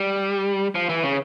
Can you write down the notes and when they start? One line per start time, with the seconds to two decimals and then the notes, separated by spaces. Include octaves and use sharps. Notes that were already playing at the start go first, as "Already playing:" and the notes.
Already playing: G3
0.75 F3
0.89 E3
1.03 C#3